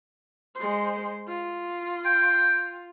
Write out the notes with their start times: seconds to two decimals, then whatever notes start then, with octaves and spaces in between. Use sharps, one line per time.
0.56 G#3 C5
1.28 F4
2.05 G5